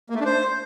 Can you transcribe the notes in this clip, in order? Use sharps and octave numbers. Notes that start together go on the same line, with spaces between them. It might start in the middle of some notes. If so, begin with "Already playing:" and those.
A#3
A3
D4
C5